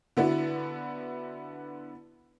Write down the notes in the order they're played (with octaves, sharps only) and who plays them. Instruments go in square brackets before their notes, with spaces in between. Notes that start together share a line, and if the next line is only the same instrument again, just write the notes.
[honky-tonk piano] D3 B3 E4 F#4